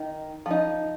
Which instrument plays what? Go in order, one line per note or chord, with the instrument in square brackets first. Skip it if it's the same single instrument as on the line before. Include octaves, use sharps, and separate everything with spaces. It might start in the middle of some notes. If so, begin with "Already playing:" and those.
Already playing: [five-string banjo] D#3 D#4
F3 D#4